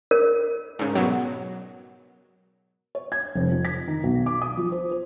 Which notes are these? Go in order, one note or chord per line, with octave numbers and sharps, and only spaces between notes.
A#4
G#2 C#3
B2 F#3
C#5
G#6
F1
F2
B6
D#3
B1
D6
D#6
F3
C5
C5